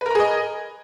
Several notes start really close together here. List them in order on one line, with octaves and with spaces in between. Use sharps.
B4 A#4 A#5 G#4 D#5